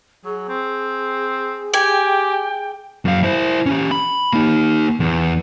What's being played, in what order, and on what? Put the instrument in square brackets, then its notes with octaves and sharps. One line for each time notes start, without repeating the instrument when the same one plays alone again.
[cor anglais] F#3 [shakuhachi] G#4
[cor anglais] C4
[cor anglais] G4 [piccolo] G5 [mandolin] G#5
[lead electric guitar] F#2 F5
E4 C5
C#4 G4
B5
A#3 D#4
E2